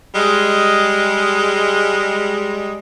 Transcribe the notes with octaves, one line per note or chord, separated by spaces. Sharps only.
G3 G#3